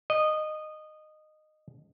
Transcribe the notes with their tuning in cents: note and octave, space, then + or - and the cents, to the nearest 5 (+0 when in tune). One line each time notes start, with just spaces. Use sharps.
D#5 -15